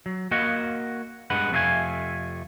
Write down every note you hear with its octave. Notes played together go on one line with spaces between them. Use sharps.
F#3
A#3 F#4 D#5 F5 F#5
G2 G#3 B4 F#5
F2 C3 A3 E4 F5 G#5